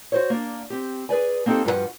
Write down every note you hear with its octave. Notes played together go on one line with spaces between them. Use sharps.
F#4 C5 C#5
A#3 D4
C4 G4
G#4 B4 D5 G#5
A#3 C4 D#4 G4 A4
G2 F3 F#4 A4 B4 F#5